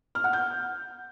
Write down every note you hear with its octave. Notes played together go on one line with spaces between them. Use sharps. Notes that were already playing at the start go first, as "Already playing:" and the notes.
F6
F#5
G6